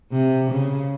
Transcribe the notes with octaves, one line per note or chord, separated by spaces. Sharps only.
C3
C#3